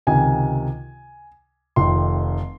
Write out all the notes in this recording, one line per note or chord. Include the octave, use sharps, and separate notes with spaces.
C#2 C3 D#3 G#5
F1 F2 D#3 C6